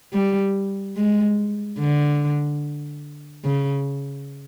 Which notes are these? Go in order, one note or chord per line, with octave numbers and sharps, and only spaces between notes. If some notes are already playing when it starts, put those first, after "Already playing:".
G3
G#3
D3
C#3